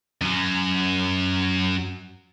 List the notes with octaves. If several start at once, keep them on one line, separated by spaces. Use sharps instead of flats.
F#2 F#3